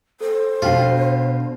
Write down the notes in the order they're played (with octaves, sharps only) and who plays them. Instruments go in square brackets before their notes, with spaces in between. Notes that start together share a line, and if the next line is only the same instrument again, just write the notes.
[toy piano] A4 [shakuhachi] C5
[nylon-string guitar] B2 D4 [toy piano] D#4 G4 G5 [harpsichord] F4